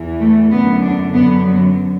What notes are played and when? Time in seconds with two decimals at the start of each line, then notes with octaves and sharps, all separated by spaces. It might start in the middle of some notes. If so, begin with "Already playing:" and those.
Already playing: E2 E3
0.20 A3
0.51 F#2 D3 B3
0.82 D4
1.13 F#2 D3 B3
1.45 F#3